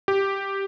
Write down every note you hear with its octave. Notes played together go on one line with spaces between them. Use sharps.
G4